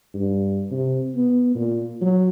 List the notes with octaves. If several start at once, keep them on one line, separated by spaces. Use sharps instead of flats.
G2
C3
B3
A#2
F#3